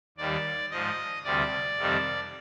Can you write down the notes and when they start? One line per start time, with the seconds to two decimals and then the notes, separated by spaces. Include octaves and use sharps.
0.18 D#2 D#3 G3 D5
0.71 G#2 F3 D#5
1.24 D2 C3 G3 D5
1.78 F2 C3 D#3 G3